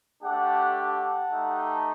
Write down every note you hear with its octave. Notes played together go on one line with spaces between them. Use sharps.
A3 D4 G4 F#5 A5
F#5 A5
A3 D#4 G4